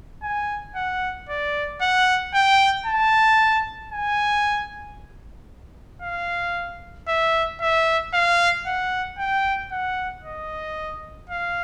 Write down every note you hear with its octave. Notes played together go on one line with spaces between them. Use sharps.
G#5
F#5
D5
F#5
G5
A5
G#5
F5
E5
E5
F5
F#5
G5
F#5
D#5
F5